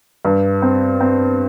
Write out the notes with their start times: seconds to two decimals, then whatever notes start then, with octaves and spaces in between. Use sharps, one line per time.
0.25 G2
0.62 C4
1.01 C4